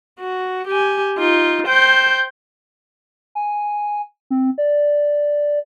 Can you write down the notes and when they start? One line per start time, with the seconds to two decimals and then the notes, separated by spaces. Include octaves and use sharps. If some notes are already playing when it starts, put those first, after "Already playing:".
0.19 F#4
0.67 G4 G#5
1.18 D#4 F4
1.67 C5 G5
3.35 G#5
4.30 C4
4.58 D5